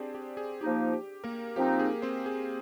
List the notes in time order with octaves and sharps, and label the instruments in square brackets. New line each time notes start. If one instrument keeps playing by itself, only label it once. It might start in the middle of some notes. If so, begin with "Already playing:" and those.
Already playing: [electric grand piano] C4 D4 G4 G#4 C5 D5
G4
G#4
[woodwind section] F3 A#3 D#4 [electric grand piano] G4
[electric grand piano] G4
A#3 A#4
[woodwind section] F3 C4 D#4 [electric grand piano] G4
[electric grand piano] G#4
C4 C5
G#4